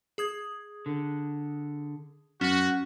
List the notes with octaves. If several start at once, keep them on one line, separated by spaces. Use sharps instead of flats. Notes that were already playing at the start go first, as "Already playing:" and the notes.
G#4 D#6 G#6
D3
F#2 C#4 F#4